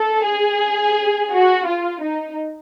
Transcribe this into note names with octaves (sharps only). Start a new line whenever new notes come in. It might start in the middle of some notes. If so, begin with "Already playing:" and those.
Already playing: A4
G#4
F#4
F4
D#4